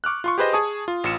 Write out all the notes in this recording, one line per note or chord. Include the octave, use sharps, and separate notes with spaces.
C#6 D6 F6 F#6
F4 C6 C#6
G4 G#4 B4 C5 D#5
G#4 G#5 A5 C#6 D#6
F4
A1 F4 C#7 E7